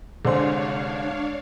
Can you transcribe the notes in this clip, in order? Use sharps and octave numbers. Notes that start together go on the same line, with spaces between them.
C2 D3 G#3 D4 C5 C#5 F5 C6